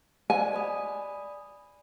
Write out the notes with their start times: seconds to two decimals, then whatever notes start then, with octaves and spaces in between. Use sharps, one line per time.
0.30 C5 D5 D#5 G#5
0.54 D5 B5 D#6